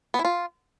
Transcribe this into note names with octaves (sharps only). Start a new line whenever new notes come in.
B3
E4
F4